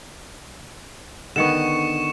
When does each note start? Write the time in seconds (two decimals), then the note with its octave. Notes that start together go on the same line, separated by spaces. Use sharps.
1.36 D3 D#3 B3 C#6 C#7 E7